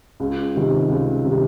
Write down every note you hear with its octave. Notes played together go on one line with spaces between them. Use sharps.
C#2
C3 D#3 G3
C#2
C3 D#3 G3